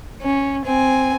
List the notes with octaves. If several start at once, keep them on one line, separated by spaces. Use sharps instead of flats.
C#4
C4 G#5